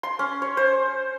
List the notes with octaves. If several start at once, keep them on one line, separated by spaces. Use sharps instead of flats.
C6
C#4
C#5
C5